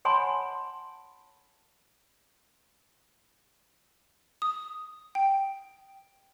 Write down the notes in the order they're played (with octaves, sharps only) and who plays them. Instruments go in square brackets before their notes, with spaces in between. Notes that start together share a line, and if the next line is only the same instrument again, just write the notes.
[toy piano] C#5 F#5 G#5 A5 B5 C6
[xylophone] D#6
G5